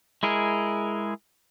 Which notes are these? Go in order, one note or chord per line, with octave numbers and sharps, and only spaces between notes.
G#3 E4 G#4 A#4